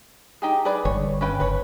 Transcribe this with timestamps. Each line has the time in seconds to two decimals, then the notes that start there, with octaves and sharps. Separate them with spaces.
0.42 D#4 G4 G#4
0.65 G#4 B4 D5
0.85 G1 C#5
1.21 C#4 B4 G5
1.40 F#1 B4 C#5